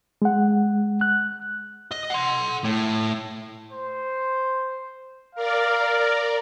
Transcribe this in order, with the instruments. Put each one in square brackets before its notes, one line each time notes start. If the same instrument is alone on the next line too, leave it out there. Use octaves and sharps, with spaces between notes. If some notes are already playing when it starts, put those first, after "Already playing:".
[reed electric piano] G#3 F#5
F#6
[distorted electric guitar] D#5
F#5 C6
A2
[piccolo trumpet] C5
[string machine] A#4 D5 [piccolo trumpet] F5